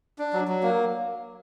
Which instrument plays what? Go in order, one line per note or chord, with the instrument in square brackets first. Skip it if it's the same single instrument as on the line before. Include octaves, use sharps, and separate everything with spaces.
[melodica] D4
F#3
F#3
A#3